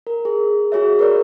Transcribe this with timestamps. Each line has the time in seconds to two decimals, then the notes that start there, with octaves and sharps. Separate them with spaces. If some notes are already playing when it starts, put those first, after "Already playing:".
0.07 A#4
0.25 G#4
0.72 F#4 G#4 C#5 E5
0.99 A#4 B4 C#5 D5